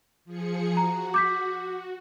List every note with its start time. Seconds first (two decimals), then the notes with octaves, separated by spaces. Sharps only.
0.25 F3 G#4 C#7
0.77 F#4 A#5
1.14 D6 G6 B6